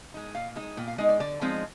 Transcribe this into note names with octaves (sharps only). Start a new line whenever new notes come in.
G#3 D#4
A#2 F5
G#3 D#4
A#2 G5
F5
G#3 D#4 D#5
D5
D3 D5
F3 G#3 C4 D#4